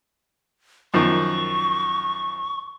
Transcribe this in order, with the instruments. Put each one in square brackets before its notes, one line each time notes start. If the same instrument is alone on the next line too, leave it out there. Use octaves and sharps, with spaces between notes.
[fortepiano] F#2 D#3 F3 [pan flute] C#6